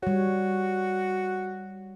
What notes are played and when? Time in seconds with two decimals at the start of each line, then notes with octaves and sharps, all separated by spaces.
0.03 G3 F#4 C#5